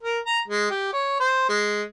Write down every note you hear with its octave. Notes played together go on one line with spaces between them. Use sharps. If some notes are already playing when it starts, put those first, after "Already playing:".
A#4
A#5
G#3
G4
C#5
C5
G#3